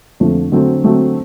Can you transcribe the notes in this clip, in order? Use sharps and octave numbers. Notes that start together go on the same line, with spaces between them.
F2 D3 F3 A3
D3 F#3 A3 C4
D3 F#3 A3 C4